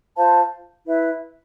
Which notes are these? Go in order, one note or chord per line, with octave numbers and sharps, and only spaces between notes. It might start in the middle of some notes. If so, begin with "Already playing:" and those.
F4 C5 F5 A5
E4 B4 E5